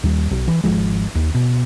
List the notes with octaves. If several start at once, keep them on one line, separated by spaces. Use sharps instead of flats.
D#2 G3
B1
E3
G#1 D#2 F3 G#3
D#2
B2